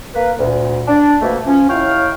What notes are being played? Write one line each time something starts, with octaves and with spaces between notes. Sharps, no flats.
A#3 B4
D2 A#2
D4
F2 B2 A3 A#3
F3 C#4
D#2 E4 C#5 F5 G5 F6